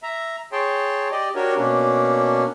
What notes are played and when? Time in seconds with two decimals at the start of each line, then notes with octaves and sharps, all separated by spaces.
0.03 E5 A#5
0.52 G#4 C#5 G5 A5 C6
1.11 G4 D5 D#5
1.35 D4 F#4 G4 A#4 C#5
1.57 B2 A#3 C#4 D4